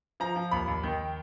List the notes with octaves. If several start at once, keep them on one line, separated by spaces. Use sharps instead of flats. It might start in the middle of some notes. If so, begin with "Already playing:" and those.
F3 A#5
F3
D#2 B5
D#2
D#3 G5